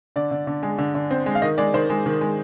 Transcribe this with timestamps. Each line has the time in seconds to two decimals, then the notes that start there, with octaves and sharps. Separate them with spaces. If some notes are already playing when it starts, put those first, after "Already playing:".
0.16 D3 D5
0.31 D3
0.47 D3
0.63 G#3
0.78 D3
0.95 D3
1.11 C4
1.26 G#3
1.35 F5
1.42 D#3 D#5
1.58 G#3 D5
1.74 D#3 C5
1.90 G#3
2.06 D#3
2.21 G#3